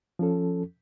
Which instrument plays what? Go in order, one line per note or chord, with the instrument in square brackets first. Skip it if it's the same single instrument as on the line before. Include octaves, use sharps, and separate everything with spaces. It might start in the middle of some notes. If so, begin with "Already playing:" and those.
[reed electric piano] F3 C#4 A4